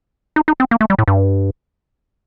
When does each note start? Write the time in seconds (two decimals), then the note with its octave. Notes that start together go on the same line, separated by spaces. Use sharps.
0.36 D#4
0.48 D#4
0.60 C4
0.71 A#3
0.81 A3
0.90 G3
0.99 A2
1.08 G2